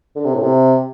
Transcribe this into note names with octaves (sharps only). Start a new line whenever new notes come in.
D3
C3
A2
C3